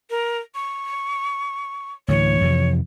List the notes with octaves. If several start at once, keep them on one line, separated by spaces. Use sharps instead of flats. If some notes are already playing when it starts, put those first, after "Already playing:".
A#4
C#6
D2 A2 E3 C#5
F2 C3 E3